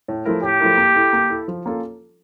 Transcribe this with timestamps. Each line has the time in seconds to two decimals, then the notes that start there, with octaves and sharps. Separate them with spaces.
0.08 A2
0.25 F3 A3 E4 A#4
0.42 A2 G4
0.60 F3 A3 E4 A#4
0.77 A#3
0.95 E4 A4
1.13 A#3
1.30 E4 A4
1.48 F3
1.66 A#3 C#4 F4 A4